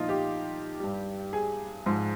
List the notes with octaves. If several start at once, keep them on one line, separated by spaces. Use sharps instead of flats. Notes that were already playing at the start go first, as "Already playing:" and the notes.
Already playing: A#2 F3 D#4 F4
G4
G2 G3
G#4
G#2 F3